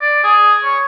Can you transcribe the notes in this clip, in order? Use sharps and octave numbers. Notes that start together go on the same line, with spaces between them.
D5
G#4
C#5